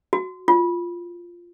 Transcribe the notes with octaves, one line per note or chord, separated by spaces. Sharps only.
F#4
F4